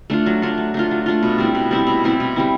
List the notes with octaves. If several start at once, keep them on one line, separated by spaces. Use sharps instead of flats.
A3 D4 F4
F#3
A3 D4 F4
F#3
A3 D4 F4
F#3
A3 D4 F4
B2
G3 C4 E4
B2
G3 C4 E4
B2
G3 C4 E4
B2
G3 C4 E4